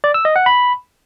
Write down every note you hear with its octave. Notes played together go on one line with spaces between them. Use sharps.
D5
E6
D#5
F#5
B5